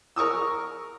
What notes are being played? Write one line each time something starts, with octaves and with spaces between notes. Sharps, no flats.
A#4 C#6 D#6 E6